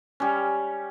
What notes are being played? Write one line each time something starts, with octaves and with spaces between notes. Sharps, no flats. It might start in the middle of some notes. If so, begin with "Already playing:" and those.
G3 C#4